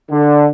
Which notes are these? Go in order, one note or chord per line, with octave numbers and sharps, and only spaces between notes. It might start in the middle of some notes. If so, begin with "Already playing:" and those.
D3